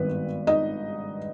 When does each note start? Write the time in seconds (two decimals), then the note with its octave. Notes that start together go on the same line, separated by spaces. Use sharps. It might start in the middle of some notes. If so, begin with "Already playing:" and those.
Already playing: G#1 G2 D#3 B3 B4
0.47 D#4 D#5